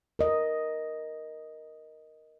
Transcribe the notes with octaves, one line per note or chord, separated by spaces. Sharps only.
A#4 D#5